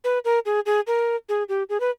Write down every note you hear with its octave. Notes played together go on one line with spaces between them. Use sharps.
B4
A#4
G#4
G#4
A#4
G#4
G4
G#4
B4